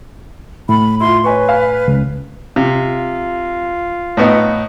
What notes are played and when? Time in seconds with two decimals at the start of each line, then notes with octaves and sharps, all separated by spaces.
0.69 A2 B5
1.00 E4 F4 C6
1.24 B4 C#5 G#5 C#6
1.48 F5 G#5
1.88 C#2
2.56 C3 F4
4.17 A2 B3 D#4